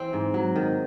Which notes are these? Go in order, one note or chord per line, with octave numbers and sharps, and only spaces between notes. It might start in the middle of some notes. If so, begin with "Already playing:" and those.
Already playing: E3 C4
G#2
F#3
D#3